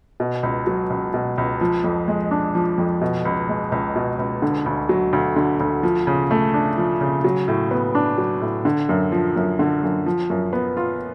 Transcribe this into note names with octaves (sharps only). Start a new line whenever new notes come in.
B2
C#2
F#3
C#2
B2
C#2
F3
F2
G#3
D4
F3
F2
B2
C#2
G#3
C#2
B2
C#2
D3
D2
F#3
D2
D3
D2
F3
C#3
A3
D4
F3
C#3
F#3
A2
B3
D4
F#3
A2
D3
F#2
F3
F#2
D3
F#2
F3
F#2
B3
F4